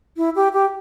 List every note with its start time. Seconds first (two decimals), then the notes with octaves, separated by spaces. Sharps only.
0.17 E4
0.36 G4
0.53 G4